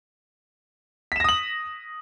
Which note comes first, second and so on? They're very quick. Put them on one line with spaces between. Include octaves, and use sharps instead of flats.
B6 E7 A#6 D#6 F#7